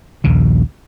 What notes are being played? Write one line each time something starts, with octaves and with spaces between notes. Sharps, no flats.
A#1 D#2 C#3